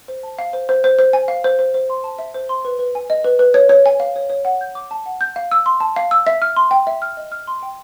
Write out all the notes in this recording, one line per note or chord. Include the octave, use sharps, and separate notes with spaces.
C5
A5
F5
C5
C5
C5
C5
G#5
F5
C5
C5
C5
C6
A5
E5
C5
C6
B4
B4
G#5
D#5
B4
B4
C#5
C#5
G#5
F5
C#5
C#5
F#5
G6
D6
A5
F#5
G6
F5
E6
C6
A5
F5
E6
E5
F6
C6
G5
E5
F6
D#5
F6
C6
G5